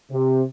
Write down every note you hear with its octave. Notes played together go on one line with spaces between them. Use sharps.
C3